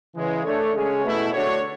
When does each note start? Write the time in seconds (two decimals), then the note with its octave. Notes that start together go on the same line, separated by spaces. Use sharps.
0.15 C#3 E3 G#3
0.45 A3 D4 A4 C#5
0.74 C#3 G#3 C#4 G#4 C#5
1.03 B2 A3 E4
1.33 D3 A3 D4 F#4 C#5